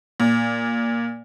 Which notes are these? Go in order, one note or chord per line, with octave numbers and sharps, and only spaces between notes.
A#2